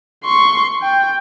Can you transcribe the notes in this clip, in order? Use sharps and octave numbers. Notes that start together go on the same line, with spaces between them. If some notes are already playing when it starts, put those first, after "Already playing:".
C6 C#6
G5